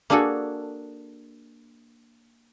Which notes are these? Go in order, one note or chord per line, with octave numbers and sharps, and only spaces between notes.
A#3 D4 F#4 G#4 A4